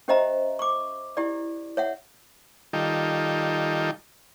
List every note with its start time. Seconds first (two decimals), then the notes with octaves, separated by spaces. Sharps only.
0.08 C#4 G4 C5 D#5 E5 A#5
0.59 C#6 D6
1.17 E4 G4 D5
1.77 C#5 E5 F#5
2.73 D#3 G3 D#4 F4 A4 G5